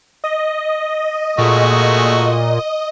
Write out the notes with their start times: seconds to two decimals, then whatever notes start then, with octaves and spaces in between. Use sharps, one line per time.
0.24 D#5
1.38 A#2 G#3 A3 F#4